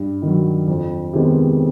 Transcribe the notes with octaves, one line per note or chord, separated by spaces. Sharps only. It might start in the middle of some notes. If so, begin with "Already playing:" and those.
Already playing: G2
D#3
F#3
F2
C3 D#3 G#3 B3